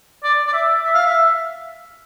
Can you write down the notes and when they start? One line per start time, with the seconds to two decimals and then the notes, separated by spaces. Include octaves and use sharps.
0.24 D5
0.47 D5
0.53 E5
0.84 E5
0.95 F5
1.06 E5